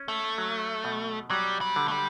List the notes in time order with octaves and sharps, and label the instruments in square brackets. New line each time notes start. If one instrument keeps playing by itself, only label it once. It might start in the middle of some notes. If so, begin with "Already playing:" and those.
Already playing: [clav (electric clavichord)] C#4
[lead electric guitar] A3
[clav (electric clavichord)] F#3
B2
[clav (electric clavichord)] F#3 [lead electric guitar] G3
[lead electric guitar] G3
[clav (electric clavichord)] D3
[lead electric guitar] A3
G3